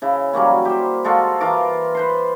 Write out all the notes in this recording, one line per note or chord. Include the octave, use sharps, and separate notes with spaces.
C#3 E4
F#3 G3 A#3 C#4
G4 C5
G#3 F4 F#4 A4
E3 F4 A#4 D6
B4 C5 C6